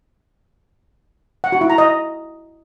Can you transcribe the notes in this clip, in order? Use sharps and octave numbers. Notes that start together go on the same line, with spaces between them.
F#5
F#4
E4
A#5
D#5